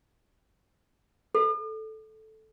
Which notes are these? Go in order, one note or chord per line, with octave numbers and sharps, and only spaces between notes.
A4